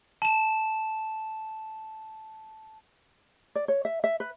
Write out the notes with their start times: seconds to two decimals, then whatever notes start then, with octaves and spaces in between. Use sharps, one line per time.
0.22 A5 E7
3.55 D5
3.68 C#5
3.85 E5
4.04 E5
4.20 B4